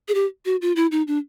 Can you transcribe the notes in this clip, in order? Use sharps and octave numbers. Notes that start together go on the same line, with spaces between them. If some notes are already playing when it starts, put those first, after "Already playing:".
G#4
G4
F#4
F4
E4
D#4
D4